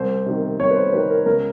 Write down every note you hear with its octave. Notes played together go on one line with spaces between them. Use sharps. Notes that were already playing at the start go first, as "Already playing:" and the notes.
Already playing: C2 C5
C3 D#3
C2 C#5
B4
C5
C3 D#3 B4
A#4
C#2 A#4